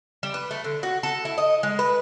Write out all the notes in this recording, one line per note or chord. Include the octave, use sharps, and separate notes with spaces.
G3
B4
A3
D3
F#4
A4
E4
D#5
G#3
B4